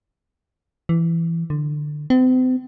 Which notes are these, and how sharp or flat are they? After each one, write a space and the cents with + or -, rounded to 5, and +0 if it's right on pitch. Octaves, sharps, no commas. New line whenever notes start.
E3 +15
D3 +20
C4 -40